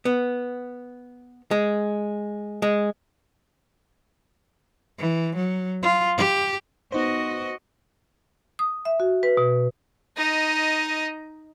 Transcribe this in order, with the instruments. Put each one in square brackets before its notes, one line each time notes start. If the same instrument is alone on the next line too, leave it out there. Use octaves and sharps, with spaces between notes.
[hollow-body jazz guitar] B3
G#3
G#3
[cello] E3
F#3
F4
G4
[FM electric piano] B3 D#4 C5 [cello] F#4 D#5
[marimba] D#6
E5
F#4
B4
B2
[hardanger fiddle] D#4 D#5